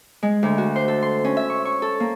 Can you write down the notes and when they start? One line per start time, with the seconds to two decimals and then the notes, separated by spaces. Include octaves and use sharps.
0.23 G#3
0.43 D2
0.58 F#4
0.76 C5
0.88 A4
1.02 C6
1.25 C#4
1.37 E5
1.50 C#6
1.65 C#6
1.82 A4
2.00 A#3